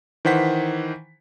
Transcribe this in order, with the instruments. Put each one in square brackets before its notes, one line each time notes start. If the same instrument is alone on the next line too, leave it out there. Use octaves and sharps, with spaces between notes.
[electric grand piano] D#3 E3 C5 F#5 B6